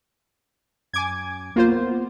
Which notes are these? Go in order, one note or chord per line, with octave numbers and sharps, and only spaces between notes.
F#2 G#5 D6 G#6
B1 A#3 F4 C5
B3